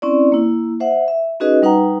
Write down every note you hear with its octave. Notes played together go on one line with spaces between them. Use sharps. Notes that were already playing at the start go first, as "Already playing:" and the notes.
C4 C#4 E4 D5
A#3 E4
C5 E5 F#5
E5
C#4 D#4 F#4 G#4 B4 D#5
G3 D#4 B4 F#5 G5 A#5